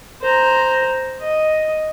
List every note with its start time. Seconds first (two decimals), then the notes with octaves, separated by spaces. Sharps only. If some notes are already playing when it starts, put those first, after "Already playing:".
0.22 C5 A#5
1.20 D#5